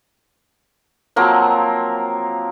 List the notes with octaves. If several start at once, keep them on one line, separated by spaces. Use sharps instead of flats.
F3 F#3 A#3 C4